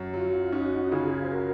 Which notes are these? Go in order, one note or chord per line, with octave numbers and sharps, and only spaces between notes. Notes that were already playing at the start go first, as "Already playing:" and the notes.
Already playing: F#2
F#3 F4
F4
C#4 D#4 F#4
C#3 F4 G#4
C5
F#4 A#4